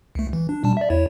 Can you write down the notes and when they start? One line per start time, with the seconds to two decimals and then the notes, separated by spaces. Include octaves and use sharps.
0.15 C#2 A3
0.33 E3
0.49 D4
0.64 B2 G3 A5
0.77 D5 E5
0.90 E2 E4 C#5